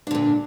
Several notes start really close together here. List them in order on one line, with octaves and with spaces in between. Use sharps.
D4 D3 A#2